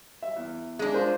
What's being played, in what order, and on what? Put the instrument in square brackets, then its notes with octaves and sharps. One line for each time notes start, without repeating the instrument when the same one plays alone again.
[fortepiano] E5
E2
[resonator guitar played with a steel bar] G#3 D4
[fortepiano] F4 A#4 [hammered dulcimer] C5